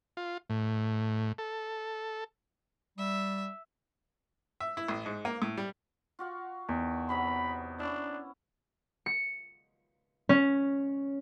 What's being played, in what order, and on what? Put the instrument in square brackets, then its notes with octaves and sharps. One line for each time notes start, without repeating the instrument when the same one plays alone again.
[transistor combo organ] F4
A2
A4
[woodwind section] G3 [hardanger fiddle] E5
[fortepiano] E5
E4
A1
G#2
A#3
A2
G3
[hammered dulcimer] F4 F#4 F5
[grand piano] E2 [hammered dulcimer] D#3
[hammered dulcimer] C3 F#3 B3 [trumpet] B5
[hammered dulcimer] C#4 E4 [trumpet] D4
[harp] C#7
C#4